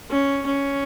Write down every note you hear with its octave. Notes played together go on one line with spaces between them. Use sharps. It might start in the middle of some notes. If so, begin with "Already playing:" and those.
C#4
C#4